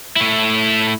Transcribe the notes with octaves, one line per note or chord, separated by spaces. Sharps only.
A3 E4